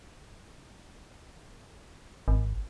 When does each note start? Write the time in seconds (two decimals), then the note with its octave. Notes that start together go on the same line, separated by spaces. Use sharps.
2.28 G#1